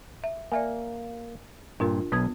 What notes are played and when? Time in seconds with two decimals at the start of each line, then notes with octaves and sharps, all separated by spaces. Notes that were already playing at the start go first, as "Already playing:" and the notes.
0.24 E5
0.52 A#3 D5 E5 G#5
1.80 G2 A#2 D4 F4 A#4
2.12 B1 B3 B4 D#6 G#6